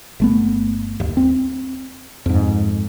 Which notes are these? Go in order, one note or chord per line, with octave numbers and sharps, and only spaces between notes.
G1 A3 B3
D#1 D#2
C4
F2 G#2